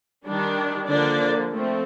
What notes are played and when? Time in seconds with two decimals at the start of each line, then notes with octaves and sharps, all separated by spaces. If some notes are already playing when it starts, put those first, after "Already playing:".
0.25 D#3 G3 D4
0.88 D3 F3 A#3 D4 D5
1.50 F3 A3 C4